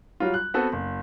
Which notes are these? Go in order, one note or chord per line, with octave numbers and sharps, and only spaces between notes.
F#3 G3 F4
F#6
B3 C4 F#4 A4 B4
F#1